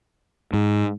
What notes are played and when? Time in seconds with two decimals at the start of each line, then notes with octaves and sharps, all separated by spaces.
0.53 G#2